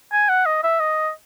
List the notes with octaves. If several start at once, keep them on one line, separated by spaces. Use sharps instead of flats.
G#5
F#5
D#5
E5
D#5